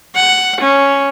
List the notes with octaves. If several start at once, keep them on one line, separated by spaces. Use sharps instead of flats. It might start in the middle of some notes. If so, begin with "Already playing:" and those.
F#5
C#4